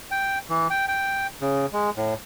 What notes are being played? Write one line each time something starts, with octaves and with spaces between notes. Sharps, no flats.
G5
E3
G5
G5
C#3
G#3
A2